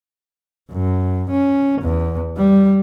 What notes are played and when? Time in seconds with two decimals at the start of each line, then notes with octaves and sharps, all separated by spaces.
0.72 F#2
1.30 C#4
1.82 E2
2.37 G3